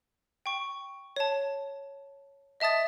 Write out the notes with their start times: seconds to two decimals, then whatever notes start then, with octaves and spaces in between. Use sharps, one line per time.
0.46 G5 C#6
1.16 C#5 A5
2.60 D#5 E5 A5 D#6 A6